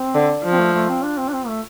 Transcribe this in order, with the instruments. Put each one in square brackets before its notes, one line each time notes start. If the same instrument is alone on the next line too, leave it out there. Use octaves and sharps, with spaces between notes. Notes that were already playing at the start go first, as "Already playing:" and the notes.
Already playing: [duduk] C4
[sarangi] D3
F3
[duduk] C4
A3
A3
C4
D4
C4
D4
C4
A3